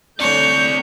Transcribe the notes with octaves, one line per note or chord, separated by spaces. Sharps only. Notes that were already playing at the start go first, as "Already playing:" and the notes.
D3 A3 C4 C#5 D5 G6